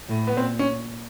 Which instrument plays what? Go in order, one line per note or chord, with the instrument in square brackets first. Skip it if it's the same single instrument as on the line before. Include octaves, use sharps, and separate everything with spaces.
[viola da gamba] A2
[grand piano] B3
[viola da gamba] A#2 [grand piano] C4
[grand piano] C#4